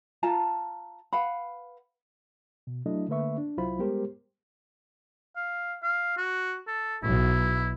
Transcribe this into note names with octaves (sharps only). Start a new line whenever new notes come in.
F4 A5 A#5
B4 F5 F#5 B5
B2
F#3 A3 D4 E4 A4 D#5
D3 A3 A#3 B4 E5 C#6
D4
C2 F#3 E4 F4 C5 B5
G3 G#3 B3 G4 A#4 C5
F5
F5
F#4
A4
B1 E4